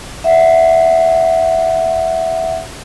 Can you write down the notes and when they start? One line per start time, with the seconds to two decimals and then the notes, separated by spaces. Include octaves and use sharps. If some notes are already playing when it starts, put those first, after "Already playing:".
0.24 E5 F#5